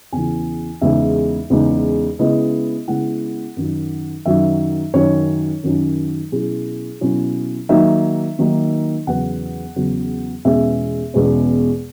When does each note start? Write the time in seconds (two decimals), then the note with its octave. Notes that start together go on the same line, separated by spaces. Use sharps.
0.12 E2 C#3 E3 G#5
0.81 E2 C#3 G#3 D#4 E5
1.50 E2 C#3 G#3 D#4
2.19 C#3 G#3 B3 E4 D#5
2.87 C#3 G#3 B3 E4 F#5
3.57 F#2 D#3 F#3
4.25 F#2 D#3 F#3 E5
4.94 F#2 D#3 F#3 C#4 C#5
5.63 F#2 D#3 F#3 C#4
6.32 B2 F#3 C#4 E4 G#4
7.01 B2 F#3 C#4 E4
7.69 D#3 F#3 A#3 D#4 E5
8.39 D#3 F#3 A#3 D#4
9.07 E2 C#3 F#3 B3 F#5
9.76 E2 C#3 F#3 B3
10.45 E2 B2 G#3 C#4 E5
11.14 E2 B2 G#3 C#4